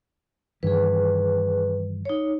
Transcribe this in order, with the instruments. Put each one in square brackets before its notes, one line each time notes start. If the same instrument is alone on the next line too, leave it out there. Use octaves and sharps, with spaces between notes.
[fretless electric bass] G2 D#3 E3 [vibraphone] G#4 B4
[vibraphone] D#4 C#5